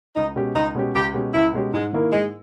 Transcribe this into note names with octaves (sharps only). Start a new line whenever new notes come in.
C#2 D#4
B2 G#3 C#4 G4
C#2 D#4
B2 G#3 C#4 G4
C#2 G4
B2 G#3 C#4 G4
C#2 E4
B2 G#3 C#4 G4
G#2 G#3
D#3 A#3 E4 A#4
G#2 G#3